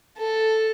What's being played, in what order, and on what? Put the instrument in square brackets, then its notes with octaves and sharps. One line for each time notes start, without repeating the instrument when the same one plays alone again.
[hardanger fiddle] A4